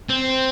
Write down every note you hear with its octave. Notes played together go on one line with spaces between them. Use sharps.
C4